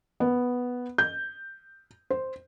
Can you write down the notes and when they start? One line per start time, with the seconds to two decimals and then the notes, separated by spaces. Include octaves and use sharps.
0.20 B3
0.98 G6
2.10 C5